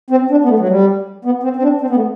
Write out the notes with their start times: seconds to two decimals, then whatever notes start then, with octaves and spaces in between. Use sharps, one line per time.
0.10 C4
0.31 D4
0.44 B3
0.49 A3
0.59 F#3
0.69 G3
1.25 B3
1.43 C4
1.56 C4
1.62 D4
1.81 C4
1.90 B3
1.95 A3